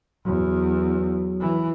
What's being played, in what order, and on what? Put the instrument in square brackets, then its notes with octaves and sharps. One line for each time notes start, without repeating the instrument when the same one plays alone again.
[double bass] E2 [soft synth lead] F#3
[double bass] E3